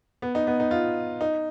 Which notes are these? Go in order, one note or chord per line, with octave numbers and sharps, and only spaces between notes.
B3
D#4
B3
D#4
F4
D#4